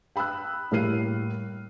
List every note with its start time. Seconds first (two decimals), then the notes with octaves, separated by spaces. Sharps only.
0.16 G5 B5 D#6 E6 F#6
0.71 A2 G3 A#3 F6 C7 D#7